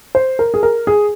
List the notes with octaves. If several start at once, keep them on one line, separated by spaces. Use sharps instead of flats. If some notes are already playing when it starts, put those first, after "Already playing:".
C5
A#4
G#4
A#4
G#4